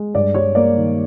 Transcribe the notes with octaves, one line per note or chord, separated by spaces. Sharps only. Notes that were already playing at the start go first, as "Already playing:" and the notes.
Already playing: G#3
G2 D5
G3 C#5
A#3 D5
D#3